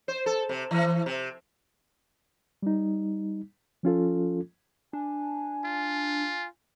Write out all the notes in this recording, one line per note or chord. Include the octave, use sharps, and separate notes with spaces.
C5
A4
C3
E3
C3
G3 D#4
F3 C#4 F4 A4
D4 G#5
F4